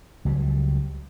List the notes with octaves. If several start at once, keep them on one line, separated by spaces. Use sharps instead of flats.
C#2 F#3 G3